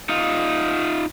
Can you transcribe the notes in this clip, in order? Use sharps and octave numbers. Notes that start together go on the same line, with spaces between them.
D#4 F4